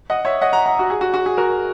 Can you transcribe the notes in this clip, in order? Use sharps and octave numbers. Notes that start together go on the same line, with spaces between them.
D#5 F#5
C#5 E5
D#5 F#5
F#5 A#5
F#5 A#5
F#4
G#4
F#4
F#4
G#4
F#4 A#4